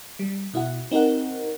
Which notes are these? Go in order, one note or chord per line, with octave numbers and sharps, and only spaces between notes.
G3
B2 E4 F#4 F#5
C4 D#4 G4 A#4 F#5